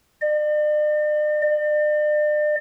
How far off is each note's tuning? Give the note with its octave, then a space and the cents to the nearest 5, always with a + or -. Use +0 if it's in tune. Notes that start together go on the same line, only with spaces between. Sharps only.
D5 +45
D5 +40